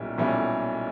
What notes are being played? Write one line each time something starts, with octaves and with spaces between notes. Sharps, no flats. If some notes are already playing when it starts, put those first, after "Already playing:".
Already playing: B1 A#2 G3 C#4 E4
B1 A#2 G3 C#4 E4